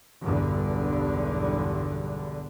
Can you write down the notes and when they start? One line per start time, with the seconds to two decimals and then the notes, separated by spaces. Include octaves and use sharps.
0.22 B1 E2 G2 D3